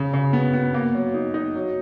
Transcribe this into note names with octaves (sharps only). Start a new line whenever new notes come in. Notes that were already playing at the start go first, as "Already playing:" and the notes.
Already playing: C#3
C#3
B3
B3
A#3
F#3
D#4
D#4
F#3